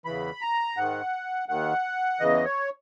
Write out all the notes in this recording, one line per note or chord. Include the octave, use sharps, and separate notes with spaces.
E2 C#3 E3 B5
A#5
G#2 D#3 F#5
D#2 D#3 F#5
E2 C#3 E3 D#5
C#5